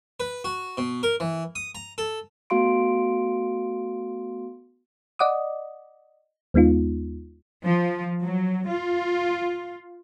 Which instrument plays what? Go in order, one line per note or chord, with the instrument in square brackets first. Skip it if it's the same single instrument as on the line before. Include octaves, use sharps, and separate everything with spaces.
[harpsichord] B4
F#4
B2
A#4
E3
D#6
A#5
A4
[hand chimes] A3 B3 F#4 F5 C6 D7
[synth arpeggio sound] D5 D#5 F#5 D6 D#6
D#2 G#3 B3 D#4 F4
[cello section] F3
F#3
F4